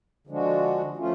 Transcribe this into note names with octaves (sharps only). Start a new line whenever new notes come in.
D3 F3 G#3 D4 F#4
F3 A3 C#4 F4